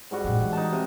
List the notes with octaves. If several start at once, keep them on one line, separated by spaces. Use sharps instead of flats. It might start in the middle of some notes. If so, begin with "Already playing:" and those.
G#2 G3 F#4
A2 C#3
E3
D#4 A5
C3